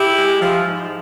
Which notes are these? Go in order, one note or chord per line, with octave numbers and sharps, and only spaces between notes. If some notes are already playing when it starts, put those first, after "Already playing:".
Already playing: E4 G4
G#3
F3
G#2